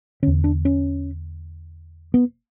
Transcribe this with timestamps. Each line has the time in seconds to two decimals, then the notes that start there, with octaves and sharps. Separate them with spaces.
0.22 D3 C#4
0.27 E2
0.44 D4
0.65 C#4
2.14 B3